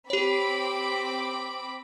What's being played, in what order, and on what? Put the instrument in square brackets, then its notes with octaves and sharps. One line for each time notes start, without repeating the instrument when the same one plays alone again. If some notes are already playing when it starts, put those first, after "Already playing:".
[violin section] C4 B5 D6 [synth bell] G4 C#5